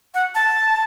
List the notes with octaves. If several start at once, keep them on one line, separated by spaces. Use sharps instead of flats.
F#5
A5